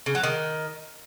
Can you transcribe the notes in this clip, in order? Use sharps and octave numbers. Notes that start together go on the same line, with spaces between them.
C#3
F#3
D#3